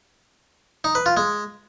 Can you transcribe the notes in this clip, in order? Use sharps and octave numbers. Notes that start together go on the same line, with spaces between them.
D#4
B4
F4
G#3